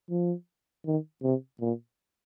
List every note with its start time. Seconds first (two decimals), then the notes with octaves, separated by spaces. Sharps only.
0.10 F3
0.86 D#3
1.23 C3
1.60 A#2